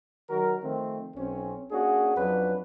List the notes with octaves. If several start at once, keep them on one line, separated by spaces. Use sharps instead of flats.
D#3 F#3 F#4 A#4
D#3 F3 A3 C4
B1 C4 C#4
A#3 C#4 D4 F#4 G#4
F2 F#3 C#4 D4 B4